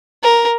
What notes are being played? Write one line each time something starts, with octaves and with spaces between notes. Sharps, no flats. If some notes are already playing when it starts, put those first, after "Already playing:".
A#4